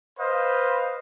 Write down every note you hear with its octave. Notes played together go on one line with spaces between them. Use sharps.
B4 C5 D#5 F5